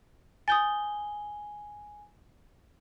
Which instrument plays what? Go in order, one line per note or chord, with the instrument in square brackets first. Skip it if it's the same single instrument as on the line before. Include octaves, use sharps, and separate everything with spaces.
[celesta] G#5 G7 [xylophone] D#6 G6 A6